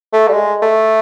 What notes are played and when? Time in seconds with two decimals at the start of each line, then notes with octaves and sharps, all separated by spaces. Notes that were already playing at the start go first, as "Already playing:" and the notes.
0.13 A3
0.28 G3
0.33 G#3
0.62 A3